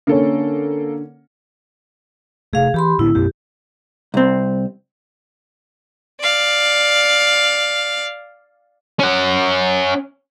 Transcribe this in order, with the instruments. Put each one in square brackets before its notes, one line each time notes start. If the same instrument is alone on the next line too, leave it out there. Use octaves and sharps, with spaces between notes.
[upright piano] D3 C#4 [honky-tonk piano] A#3 A4
[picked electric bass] C3 A3 [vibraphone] G#4 F5
[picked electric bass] E3 [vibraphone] G4 B5 C6
[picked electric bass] A2 D3 B3 [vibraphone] E4
[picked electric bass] F#2 B2 B3 [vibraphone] G4
[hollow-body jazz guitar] C2 C4
[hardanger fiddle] D5 F5
[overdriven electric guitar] C#4 F#5